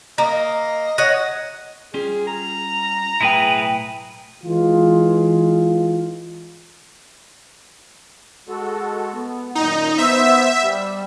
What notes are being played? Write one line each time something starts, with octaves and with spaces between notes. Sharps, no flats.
A#3 D#5
C#5 D#5 F#5
G3 C#4 F4 G#4
A#5
B1 A2 E4 G#4 B4 G5
E3 G#3 F4
G#3 F#4 A4
B3
F#2 A#2 D#3 D#4
B3 C5 E5
G3